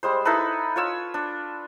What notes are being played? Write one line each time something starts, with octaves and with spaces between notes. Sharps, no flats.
G3 G#3 C5
D#4 E4 A4 B4
F4 C#5 E6
D4